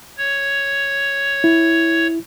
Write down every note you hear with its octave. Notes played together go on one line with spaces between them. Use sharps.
C#5
E4